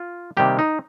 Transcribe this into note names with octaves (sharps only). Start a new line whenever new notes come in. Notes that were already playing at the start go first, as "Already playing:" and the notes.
Already playing: F4
C3 D#3 G3 A#3 G4
D#4